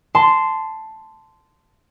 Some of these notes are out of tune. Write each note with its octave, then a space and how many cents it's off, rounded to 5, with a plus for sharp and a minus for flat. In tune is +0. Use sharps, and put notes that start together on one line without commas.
A5 +0 C6 -10